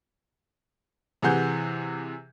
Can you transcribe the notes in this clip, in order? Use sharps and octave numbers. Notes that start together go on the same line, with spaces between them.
C3 E3 G#4 F#5 G6